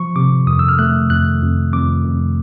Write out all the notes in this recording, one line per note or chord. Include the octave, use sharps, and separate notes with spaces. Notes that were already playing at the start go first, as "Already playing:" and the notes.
Already playing: F3 C#6
C3 D6
F2 D#6
E6
F6
A3 F#6
F2 F#6
F2
F2 D6
F2